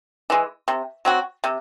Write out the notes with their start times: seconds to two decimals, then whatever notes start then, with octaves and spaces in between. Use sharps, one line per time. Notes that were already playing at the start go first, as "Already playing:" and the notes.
0.30 E3 G#3
0.68 C3
1.05 F#3 C4 F#4
1.44 C3